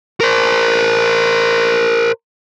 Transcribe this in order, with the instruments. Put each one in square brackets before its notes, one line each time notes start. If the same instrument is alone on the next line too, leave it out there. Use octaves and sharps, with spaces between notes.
[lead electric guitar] A#4 C5